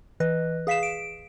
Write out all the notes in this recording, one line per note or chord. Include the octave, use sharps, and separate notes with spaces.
E3 B4 D#5
G#4 F5 B6 C7 E7
D7